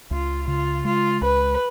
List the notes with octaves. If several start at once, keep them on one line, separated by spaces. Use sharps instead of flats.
C#2 F4
C#3 F4
G#3 F4
C#2 B4